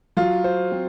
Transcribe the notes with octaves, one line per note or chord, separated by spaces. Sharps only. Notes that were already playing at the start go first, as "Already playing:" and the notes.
F#3 F4
C5
C4